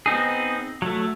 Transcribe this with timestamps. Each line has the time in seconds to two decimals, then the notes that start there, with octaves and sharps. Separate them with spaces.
0.06 B3 C4 D#4 G#4
0.82 F#3 A3